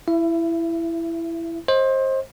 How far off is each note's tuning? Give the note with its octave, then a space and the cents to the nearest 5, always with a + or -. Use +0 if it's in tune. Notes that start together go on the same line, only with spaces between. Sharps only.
E4 +10 E5 +35
C5 +25 D#5 +20